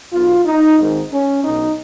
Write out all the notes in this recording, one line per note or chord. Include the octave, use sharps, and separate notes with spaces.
B1 B2 F4
D#4
G#1 G#2 D#3
C#4
B1 B2 D#4